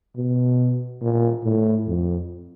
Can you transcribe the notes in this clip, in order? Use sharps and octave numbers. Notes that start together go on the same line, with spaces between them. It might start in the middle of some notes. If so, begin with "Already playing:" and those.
B2
A#2
A2
F2